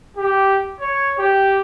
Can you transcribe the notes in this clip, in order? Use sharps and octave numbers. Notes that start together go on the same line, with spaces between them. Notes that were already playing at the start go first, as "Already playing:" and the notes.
G4
C#5
G4